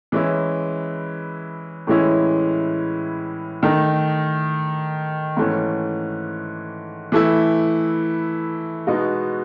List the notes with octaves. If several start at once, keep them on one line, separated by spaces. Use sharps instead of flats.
E3 G#3 C#4 E4
A2 E3 G#3 C#4 E4
D#3 A3 D#4
G#2 E3 A3 C#4
E3 A3 E4
B2 G#3 B3 D#4 F#4